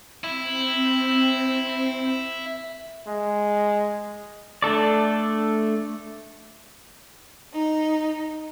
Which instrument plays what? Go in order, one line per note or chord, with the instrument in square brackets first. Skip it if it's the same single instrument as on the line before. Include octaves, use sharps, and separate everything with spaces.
[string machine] C4 [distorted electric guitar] E4
[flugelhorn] G#3
[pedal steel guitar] A3 D4 A4 D5
[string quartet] D#4